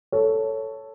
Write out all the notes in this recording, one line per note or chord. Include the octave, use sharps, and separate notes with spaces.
A4 C#5